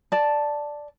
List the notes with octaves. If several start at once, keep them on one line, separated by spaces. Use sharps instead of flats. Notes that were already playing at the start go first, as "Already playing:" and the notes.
D5 A5